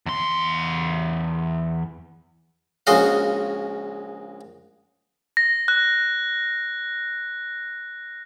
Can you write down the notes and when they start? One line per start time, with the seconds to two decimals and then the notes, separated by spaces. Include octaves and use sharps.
0.06 E2 C6
2.87 A#1 C#3 G#3 F#4 D#5 F5
5.37 A#6
5.68 F#6